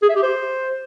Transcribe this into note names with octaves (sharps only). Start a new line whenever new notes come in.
G#4
E5
G4
C5